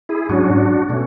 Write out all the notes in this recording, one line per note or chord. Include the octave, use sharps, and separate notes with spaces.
E4 G#4
G#2 F#3 C#4 D4 F#4
B2 A3 C#4